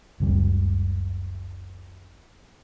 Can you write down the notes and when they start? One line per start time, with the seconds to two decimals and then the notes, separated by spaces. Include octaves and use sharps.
0.20 F#1 C#2 G3